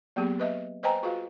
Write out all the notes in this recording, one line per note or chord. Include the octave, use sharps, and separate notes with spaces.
F#3 A#3 B3 G4 G#4
B4 D#5 E5
B4 C5 D#5 G5 G#5 A#5
F4 F#4 G#4 B4 F5